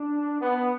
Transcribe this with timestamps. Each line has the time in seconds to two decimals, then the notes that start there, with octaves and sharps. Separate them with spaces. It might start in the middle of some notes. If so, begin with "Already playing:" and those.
Already playing: D4
0.41 B3